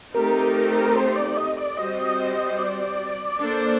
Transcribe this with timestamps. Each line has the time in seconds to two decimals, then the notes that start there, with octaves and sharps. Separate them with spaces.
0.14 A3 C4 D#4 G4 A#4
0.96 C5
1.16 D5
1.37 D#5
1.57 D5
1.77 G3 C4 F#4 C5 D#5
2.58 D5
3.40 A#3 D4 A4 C5